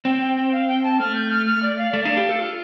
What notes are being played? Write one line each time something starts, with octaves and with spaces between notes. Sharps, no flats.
C4 G5
G5
G5
F5
G5
A5
A3 F6
G6
F6
F6
D5
F5
A3 D5
D4 F5
G4
A4
F4